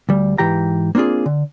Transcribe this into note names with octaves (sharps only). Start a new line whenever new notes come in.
D2 G3
G#2 E3 G4 G5 A#5
A#3 C4 D4 F4 G#4
D3